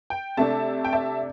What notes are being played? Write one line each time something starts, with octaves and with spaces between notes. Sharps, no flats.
G5
C3 A3 D4 E5 A5
G5
E5 A5